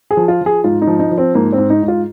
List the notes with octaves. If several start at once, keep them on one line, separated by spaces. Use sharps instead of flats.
G#4
F3
F4
F3 G#4
G#2 F4
D#4
F3
D#4
F3
C4
G#2 A#3
C4
G#2
D#4
G#2
F4